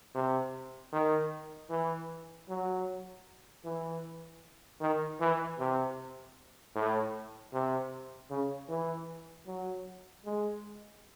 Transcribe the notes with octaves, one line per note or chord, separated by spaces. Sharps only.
C3
D#3
E3
F#3
E3
D#3
E3
C3
A2
C3
C#3
E3
F#3
G#3